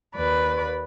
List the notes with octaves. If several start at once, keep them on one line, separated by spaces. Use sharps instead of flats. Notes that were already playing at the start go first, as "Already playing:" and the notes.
D#2 B4 D5 B5